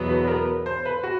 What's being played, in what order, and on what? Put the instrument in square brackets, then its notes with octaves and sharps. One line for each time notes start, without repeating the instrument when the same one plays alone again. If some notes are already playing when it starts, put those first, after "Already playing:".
Already playing: [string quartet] E2 B2 F#3 B3
[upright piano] B4
A#4
C5
B4
F#4